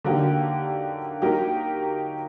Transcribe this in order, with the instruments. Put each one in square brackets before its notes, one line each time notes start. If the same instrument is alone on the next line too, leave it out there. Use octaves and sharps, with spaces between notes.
[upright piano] D3 F#3 A#3 D#4 G4
F#3 A#3 D#4 G4 A#4